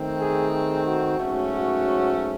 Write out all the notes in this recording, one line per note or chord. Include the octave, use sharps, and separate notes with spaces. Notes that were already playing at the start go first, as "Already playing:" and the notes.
Already playing: D#3 A3 C4
G#4
G#4
F#4
G#2 F#3 A3 C#4
F#4